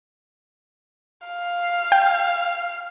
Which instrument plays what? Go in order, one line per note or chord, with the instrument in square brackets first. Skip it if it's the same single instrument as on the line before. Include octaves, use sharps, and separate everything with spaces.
[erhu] F5
[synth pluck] G5